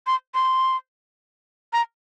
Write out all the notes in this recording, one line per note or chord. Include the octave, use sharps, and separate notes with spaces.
C6
C6
A#5